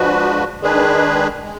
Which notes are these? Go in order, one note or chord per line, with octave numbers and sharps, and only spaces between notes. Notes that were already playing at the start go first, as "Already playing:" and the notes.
Already playing: F3 G#3 D4 F#4 B4
D#3 G#3 D4 G#4 B4
G#3